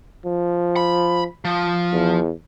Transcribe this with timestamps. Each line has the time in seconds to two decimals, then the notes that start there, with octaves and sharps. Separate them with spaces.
0.25 F3
0.76 B5
1.45 F3
1.93 E2